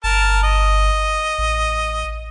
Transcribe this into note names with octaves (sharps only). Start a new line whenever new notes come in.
G1 A#4 A5
D#5
A1